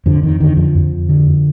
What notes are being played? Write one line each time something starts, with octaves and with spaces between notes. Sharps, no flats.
F2 D3
D#3
D3 D#3
F3
F2
D3